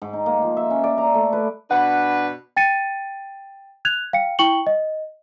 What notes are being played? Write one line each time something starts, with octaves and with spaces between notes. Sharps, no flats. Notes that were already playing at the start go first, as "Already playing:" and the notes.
G#2
D#4
A#3
F3
E5
C#4
D5
A#5
A3
B4
B2 D4 B4 F#5
G5 A6 C#7 D#7
F#6 G#6 F7
F5 G5 C#7
E4 G5 C#6 C#7 F#7 G7
D#5